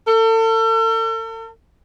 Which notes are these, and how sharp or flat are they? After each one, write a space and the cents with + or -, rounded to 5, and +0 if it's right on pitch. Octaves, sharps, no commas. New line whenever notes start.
A4 +40